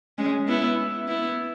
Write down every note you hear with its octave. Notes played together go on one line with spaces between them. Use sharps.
G#3 C#4
B3 E4
B3 E4